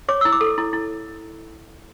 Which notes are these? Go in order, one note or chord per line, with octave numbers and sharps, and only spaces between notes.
C#5 D6
E4 E6
D6
A4
E4
E4